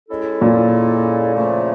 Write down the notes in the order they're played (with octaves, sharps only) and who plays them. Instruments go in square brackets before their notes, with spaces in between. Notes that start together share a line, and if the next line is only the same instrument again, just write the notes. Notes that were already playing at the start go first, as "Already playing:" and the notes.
[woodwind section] G#3 C#4 E4 A4
[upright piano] A#2
[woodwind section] C#3 F3 A3